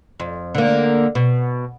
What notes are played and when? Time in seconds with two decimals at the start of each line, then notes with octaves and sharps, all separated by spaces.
0.20 F2
0.55 D3 A#3
1.15 B2